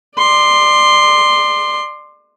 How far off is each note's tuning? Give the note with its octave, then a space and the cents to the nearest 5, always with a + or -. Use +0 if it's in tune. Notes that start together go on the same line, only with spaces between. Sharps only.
D5 +30 C6 +0